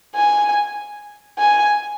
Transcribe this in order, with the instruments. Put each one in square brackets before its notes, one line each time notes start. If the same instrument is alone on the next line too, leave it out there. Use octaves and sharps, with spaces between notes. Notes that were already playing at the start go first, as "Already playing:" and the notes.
[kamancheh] G#5
G#5